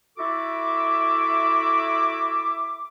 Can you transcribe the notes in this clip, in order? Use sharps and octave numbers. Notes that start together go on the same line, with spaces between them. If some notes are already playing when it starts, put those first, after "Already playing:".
E4 F#4 A4 E5 D6